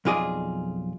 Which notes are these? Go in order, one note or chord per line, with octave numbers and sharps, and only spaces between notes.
B1 F2 F4 G#4 D5 D#5